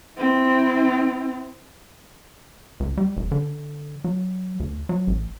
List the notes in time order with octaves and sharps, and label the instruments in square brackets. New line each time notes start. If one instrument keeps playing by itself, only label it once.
[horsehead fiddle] C4 E4
[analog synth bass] C#2
G3
E1
D3
F#3
D2
F#3
A1